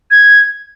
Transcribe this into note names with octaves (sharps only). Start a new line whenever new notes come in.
G#6